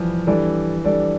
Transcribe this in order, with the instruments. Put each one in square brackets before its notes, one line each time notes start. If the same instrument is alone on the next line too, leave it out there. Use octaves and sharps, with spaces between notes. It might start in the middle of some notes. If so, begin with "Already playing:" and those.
Already playing: [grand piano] E3 F3 G3
[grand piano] E3 [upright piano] G3 D4 A4 D5
[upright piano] G3 D4 A4 D5